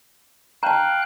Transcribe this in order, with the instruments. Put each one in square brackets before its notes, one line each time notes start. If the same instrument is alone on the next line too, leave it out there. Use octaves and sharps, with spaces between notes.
[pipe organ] F5 G5 F#6 [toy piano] A5 A#5